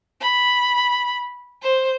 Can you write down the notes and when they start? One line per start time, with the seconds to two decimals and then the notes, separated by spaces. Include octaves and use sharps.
0.21 B5
1.62 C5